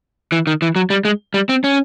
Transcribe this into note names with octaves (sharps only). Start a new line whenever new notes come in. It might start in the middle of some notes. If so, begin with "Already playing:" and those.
E3
D#3
E3
F#3
G3
G#3
G3
C4
C#4